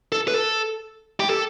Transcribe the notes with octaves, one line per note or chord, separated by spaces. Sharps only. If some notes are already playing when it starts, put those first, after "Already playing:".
A4
B4
A4
G4
A4